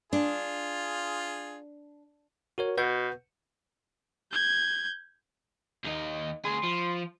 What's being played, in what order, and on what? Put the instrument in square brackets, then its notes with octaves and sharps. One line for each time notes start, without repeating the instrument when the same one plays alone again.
[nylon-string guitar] D4 [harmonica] F4 G#4
[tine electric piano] F#4 A#4 C#5
[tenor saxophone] B2 [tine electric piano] B4 F#5 G6
[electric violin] G6 G#6
[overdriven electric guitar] D#2 D#4
[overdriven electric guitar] D2 G#4 [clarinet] C6
[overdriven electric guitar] F3